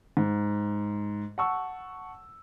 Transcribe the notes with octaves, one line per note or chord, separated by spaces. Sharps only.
G#2
F#5 A5 C#6 E6